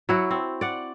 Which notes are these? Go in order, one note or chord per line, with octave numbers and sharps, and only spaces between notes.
F#3 E4 F#4
C4
D5 F#5